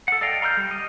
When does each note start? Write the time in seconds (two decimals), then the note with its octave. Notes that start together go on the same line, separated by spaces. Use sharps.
0.08 A4 F#5
0.21 A4 D5 D#5 F5 G5
0.41 F5 A#5 C6 F6 G6
0.57 G3
0.71 G4 D#5